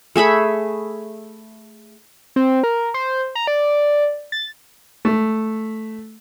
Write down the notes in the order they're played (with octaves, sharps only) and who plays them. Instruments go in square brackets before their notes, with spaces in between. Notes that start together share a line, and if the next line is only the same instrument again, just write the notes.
[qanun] A3 G#4 E5 B5
[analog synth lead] C4
A#4
C5
A#5
D5
A6
[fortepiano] A3